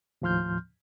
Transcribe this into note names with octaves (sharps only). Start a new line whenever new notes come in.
D#2 A2 F3 C6 F6 G6